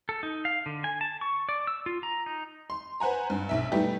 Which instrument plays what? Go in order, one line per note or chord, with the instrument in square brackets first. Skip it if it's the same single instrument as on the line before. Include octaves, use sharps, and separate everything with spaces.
[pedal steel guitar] A4
D#4
F5
D3
G#5
A5
C#6
D5
E6
F4
A#5
D#4
[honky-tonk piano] C6
B4 C5 F#5 G#5 A#5
G2
B1 E5
G3 A3 B3 D#4 E4 G4